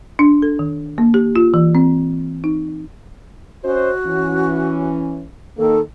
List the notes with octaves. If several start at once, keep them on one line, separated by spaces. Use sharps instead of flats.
D4
A4
D#3
A#3
G4
F4
E3
C4
D#4
C#4 F#4 C5 D#5
E3 C#4
D#3 A#3 A4